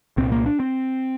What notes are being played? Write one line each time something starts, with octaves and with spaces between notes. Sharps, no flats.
C2 A#2 C4
A#3
D4
C4